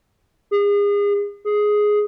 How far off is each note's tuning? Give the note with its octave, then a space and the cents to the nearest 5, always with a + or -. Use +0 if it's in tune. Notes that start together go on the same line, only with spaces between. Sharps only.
G#4 -35
G#4 +5